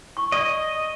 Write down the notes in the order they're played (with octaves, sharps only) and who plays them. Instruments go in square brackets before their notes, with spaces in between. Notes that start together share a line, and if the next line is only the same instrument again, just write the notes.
[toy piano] C#6
[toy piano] D5 C#6 [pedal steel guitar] D#5